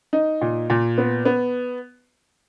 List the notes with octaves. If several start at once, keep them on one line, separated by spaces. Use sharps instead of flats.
D#4
A#2
A#2
B3
B3